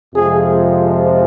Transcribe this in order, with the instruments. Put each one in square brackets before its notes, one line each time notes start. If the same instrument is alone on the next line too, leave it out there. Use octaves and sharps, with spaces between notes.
[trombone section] F2 C3 F3 G#3 G#4